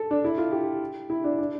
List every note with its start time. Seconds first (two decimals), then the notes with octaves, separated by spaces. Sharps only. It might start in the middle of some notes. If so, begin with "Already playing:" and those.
Already playing: A4
0.11 D4
0.24 E4
0.38 F4
0.51 G4
1.10 E4
1.24 D4
1.38 D4